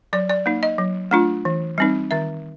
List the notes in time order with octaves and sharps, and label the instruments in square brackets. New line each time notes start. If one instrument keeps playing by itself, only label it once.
[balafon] F#3 D5
D5
A#3 D#4
D#5
F#3
A3 D4 F4
E3
G3 C4 D#4
D#3 E5